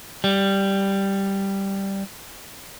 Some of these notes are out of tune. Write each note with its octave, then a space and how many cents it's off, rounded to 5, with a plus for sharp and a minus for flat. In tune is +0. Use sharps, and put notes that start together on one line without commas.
G3 +0